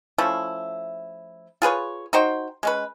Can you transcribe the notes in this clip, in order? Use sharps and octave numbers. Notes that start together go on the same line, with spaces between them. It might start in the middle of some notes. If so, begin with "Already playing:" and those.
F3 A3 C#4 E4
F4 G#4 B4 C#5
D#4 F#4 C5 G5
G#3 C#4 B4